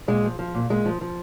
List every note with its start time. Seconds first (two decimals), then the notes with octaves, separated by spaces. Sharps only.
0.08 A#2 G#3
0.23 F3
0.39 F3
0.55 A#2
0.70 A#2 G#3
0.86 F3
1.01 F3